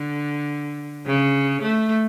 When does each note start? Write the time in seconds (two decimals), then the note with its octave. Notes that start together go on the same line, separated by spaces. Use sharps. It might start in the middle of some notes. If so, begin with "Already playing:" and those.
Already playing: D3
1.06 C#3
1.62 A3